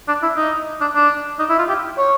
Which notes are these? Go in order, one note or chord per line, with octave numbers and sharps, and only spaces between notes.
D4
E4
D#4
D4
D4
D#4
E4
F4
G4
C#5